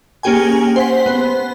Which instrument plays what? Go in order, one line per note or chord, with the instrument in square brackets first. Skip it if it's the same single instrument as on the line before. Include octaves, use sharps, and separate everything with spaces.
[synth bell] A#3 C#4 G4 G#4 G5 G#5
C5 F#5 B6
B3 C5